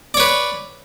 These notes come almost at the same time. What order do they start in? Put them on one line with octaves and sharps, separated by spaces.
D5 C#5 B4